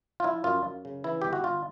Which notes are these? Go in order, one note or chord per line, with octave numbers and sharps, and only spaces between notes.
F4
F3 E4
F#2 F4
F#2
C#3
E3 E4
G1 G4
F#4
G1 F4